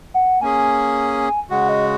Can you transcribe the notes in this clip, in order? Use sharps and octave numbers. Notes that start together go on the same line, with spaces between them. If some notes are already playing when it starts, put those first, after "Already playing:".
F#5
A#3 C#4 G#4 G#5
C#3 G#3 F#4 F#5
D#5